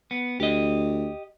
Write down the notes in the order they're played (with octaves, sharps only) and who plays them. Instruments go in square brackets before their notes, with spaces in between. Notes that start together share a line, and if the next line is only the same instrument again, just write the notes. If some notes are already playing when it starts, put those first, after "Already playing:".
[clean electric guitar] B3
[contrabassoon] D2 [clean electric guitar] G4 D#5